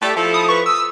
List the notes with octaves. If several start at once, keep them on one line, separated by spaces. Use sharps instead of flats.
A3 G4 D5
F3 E4 A4 E6
B5 D#6
B4 C#6
D#6 E6